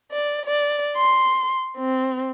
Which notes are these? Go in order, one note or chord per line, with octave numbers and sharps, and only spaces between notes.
D5
D5
C6
C4